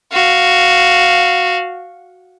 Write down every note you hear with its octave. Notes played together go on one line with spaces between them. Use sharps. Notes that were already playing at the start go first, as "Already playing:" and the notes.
F#4 F5